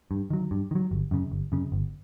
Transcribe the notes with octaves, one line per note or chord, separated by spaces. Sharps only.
G2
D#3 F#3
G2
D#3
F#3
G1
F#2 C#3
G1
F#2 C#3
G1